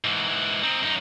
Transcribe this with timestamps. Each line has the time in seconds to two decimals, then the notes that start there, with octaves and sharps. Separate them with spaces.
0.04 G#2 E3
0.63 C4 D#4
0.82 F#2 D#4